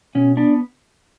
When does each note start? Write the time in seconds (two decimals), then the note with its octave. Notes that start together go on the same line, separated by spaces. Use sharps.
0.15 B2 C#4
0.37 B3 D4